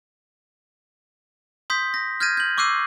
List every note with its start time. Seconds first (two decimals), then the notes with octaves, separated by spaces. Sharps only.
1.70 C6 D#6 G6 B6
1.94 A#6
2.20 F6 G6 G#6 A#6 D#7
2.37 G6 F#7
2.57 C#6 D6 E6 F#6 C7 D#7